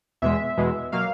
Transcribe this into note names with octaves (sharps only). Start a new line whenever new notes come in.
E2 B2 G#3 E5
E2 B2 G#3
B2 F#3 A#3 F5